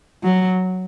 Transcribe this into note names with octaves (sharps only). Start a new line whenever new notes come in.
F#3